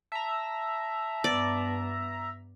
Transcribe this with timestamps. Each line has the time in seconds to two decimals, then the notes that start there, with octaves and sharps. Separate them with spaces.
0.12 E5 A5 A#5
1.24 G2 B3 D5